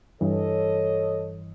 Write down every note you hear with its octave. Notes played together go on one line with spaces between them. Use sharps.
G2 E3 A4 C#5 D#5